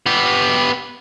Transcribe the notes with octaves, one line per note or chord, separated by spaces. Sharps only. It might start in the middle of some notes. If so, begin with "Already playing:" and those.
B3 G4